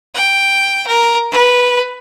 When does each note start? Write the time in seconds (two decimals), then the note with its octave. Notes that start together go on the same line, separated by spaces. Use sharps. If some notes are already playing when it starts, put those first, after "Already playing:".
0.15 G5
0.87 A#4
1.31 B4